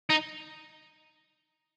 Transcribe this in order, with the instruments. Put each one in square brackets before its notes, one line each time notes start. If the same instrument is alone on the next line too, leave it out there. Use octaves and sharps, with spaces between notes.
[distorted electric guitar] D#4